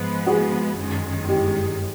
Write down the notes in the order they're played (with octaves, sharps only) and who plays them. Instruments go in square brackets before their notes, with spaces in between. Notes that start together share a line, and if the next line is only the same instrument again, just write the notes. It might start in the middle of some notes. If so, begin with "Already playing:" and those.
Already playing: [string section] G#2 F3 G#3 B3
[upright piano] F#4 G#4
[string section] G1 F#2 D#3 G#3
[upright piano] G4